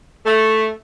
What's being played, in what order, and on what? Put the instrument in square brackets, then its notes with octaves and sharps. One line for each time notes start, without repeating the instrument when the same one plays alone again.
[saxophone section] A3